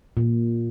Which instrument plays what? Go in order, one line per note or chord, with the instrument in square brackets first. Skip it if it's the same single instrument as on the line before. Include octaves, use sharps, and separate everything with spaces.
[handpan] A#2